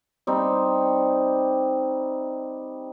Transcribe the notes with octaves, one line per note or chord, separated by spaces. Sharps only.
G3 C4 D#4